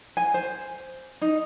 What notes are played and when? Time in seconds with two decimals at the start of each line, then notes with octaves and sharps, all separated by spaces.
0.17 G#5
0.34 C5
1.22 D#4